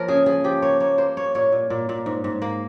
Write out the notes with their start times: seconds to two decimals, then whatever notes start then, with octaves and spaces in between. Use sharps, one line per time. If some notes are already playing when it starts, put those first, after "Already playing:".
Already playing: F3 A#3 A#4 C#5
0.08 C#3 G#4
0.26 F3 G#4
0.44 F3 G4
0.62 A#3 C#5
0.80 A#3 C#5
0.98 A#3 C5
1.17 A#3 C#5
1.35 A#2 C#5
1.52 A#2
1.70 A#2
1.89 A#2
2.06 G#2
2.24 G#2
2.42 A#3